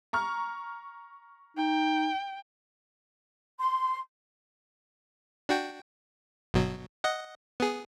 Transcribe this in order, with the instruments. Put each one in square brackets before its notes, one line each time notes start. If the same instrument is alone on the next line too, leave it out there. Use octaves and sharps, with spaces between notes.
[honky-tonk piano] A#5 C#6 F6
[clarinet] D#4 [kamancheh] G5
[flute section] C6
[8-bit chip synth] D4 F#4 G5
G1 B2 F#3
D#5 F#5
B3 G#4